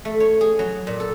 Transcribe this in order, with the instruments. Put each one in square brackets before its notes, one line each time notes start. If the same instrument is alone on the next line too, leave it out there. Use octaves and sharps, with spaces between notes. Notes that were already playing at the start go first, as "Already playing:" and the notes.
[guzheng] A3
C#5
G#4
F#3
A#2
A4